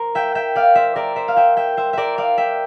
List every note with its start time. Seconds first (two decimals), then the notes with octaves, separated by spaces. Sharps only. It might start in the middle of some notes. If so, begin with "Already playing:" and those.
Already playing: A#4 C5
0.15 E5 G5
0.35 E5 G5
0.56 D5 F5
0.75 C5 E5
0.96 A#4 D5
1.16 C5 E5
1.28 F5
1.36 E5 G5
1.57 E5 G5
1.77 C5 E5
1.93 A#4 D5 E5
2.18 D5 F5
2.38 E5 G5